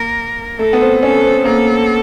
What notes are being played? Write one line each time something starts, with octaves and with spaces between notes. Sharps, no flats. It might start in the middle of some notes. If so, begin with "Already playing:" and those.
Already playing: A#3 A#4
A3 A4
B3
C4
C#4 A4
C4
A#3 A4